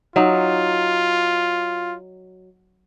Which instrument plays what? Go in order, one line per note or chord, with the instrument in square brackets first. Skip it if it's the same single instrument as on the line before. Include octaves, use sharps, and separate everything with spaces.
[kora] F#3 D#4 [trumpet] F4